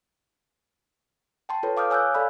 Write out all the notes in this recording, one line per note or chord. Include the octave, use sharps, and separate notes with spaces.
G5 A5 C6
F4 A4 B4 C#5
F5 D6 D#6 F6 G6
C#5 G#5 E6 F#6 G6
A4 D5 F5 B5